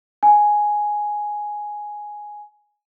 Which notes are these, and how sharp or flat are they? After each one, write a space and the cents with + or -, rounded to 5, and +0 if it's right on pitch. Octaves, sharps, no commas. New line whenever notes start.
G#5 +5